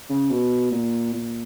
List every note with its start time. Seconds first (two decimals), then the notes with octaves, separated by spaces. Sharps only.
0.09 C#3
0.30 B2
0.71 A#2
1.13 A#2